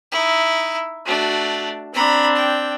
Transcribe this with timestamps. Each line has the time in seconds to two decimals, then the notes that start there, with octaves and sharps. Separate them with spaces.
0.11 D#4 E4
1.06 A3 D4 F#4
1.93 C4 D4 A#5 B5
2.35 G5